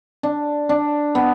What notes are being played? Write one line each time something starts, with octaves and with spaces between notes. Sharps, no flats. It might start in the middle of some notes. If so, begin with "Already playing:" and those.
D4
D4
B3